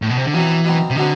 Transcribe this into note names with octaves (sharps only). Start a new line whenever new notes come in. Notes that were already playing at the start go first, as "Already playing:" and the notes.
A2
B2
C3
D3
B2 E3 F#3 C4
B2 F#3 C4
C3
B2 D3 F#3 C4